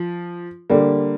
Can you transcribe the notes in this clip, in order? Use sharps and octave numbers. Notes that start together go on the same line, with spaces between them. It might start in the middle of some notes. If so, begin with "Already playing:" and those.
Already playing: F3
D3 G3 A#3